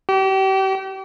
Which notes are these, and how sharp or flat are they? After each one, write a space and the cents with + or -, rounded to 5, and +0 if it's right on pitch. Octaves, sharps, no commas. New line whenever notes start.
G4 -35